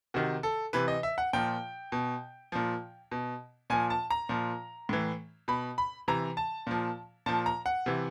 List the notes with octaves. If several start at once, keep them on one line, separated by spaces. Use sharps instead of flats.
C3 D#3 F#4
A4
C3 E3 B4
D#5
E5
F#5
A#2 F3 G5
B2
A#2 F3
B2
A#2 F3 G#5
A5
A#5
A#2 F3
A2 E3
B2 B5
B5
C3 E3 A#5
A5
A#2 F3
A#2 F3 A5
A#5
F#5
C3 E3